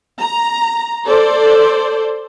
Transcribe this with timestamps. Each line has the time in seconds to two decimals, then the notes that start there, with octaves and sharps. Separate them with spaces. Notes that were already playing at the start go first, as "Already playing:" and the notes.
0.19 A#5
1.07 A4 C5 D5